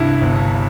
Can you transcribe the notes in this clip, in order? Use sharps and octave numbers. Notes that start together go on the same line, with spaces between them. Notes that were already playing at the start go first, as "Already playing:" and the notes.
Already playing: C2 G2 E4
G1